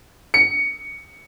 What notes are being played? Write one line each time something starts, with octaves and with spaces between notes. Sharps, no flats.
C#7